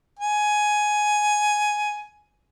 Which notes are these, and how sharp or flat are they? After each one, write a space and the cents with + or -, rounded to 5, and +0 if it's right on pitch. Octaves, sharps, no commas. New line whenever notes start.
G#5 +10